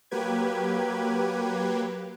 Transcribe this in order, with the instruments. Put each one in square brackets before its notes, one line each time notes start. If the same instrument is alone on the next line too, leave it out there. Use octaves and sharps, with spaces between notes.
[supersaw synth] F#3 A#3 G4 B4 G#6